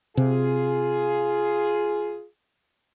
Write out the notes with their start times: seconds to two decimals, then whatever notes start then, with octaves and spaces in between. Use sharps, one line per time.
0.17 C3 F4 G#4